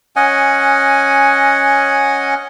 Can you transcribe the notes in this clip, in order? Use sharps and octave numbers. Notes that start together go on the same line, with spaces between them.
C#4 D#5 F#5 G#5